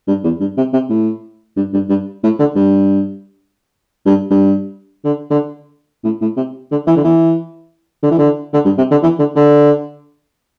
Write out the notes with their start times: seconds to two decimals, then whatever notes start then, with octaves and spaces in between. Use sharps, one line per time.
0.07 G2
0.24 E2
0.40 G2
0.57 C3
0.73 C3
0.89 A2
1.56 G2
1.73 G2
1.89 G2
2.23 A2
2.39 D3
2.55 G2
4.06 G2
4.30 G2
5.04 D3
5.30 D3
6.04 A2
6.21 A2
6.37 C3
6.71 D3
6.86 E3
6.96 D3
7.04 E3
8.02 D3
8.11 E3
8.18 D3
8.53 D3
8.65 G2
8.78 C3
8.91 D3
9.03 E3
9.19 D3
9.36 D3